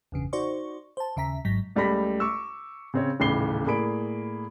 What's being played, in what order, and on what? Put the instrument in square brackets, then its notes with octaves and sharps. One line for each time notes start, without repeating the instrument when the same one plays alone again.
[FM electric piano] G1 E2 C#3
D#4 F#4 C5 D5 C#6
C5 A5
D#2 C#3 E5 A#5 B6
G#1 G#2 F#3 A#6 B6
[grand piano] C#2 G3 A3 B5 A#6 B6
C#6 D6 E6
C#3 C4 C#5
D#1 A1 C#3 B5 C7 G7
A2 A#3 G#4 D5 B5 D7